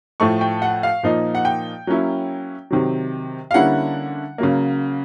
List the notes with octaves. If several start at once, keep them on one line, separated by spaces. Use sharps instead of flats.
A2 F3 A3 C#6
G5
F#5
F5
A#2 F3 A#3 D#4
F#5
G5
F#3 A#3 C#4 E4
C3 D#3 F#3
F5
D3 G3 A#3 C#4 E4 F#5
C#3 F#3 A#3